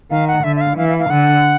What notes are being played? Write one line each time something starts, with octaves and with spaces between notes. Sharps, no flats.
D#3 F5
F#5
D3 E5
E5
F5
E3 F5
F5
F5
D3 F#5